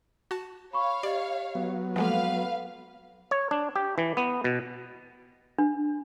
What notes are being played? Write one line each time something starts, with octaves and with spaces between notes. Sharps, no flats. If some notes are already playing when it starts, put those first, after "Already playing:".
F#4 A5
C#5 F5 B5 C#6
G4 D5 D#5
F#3 B3
F3 G#3 A#3 A4 B4 F5 F#5
C#5
D4
G4
E3
B3
B2
D4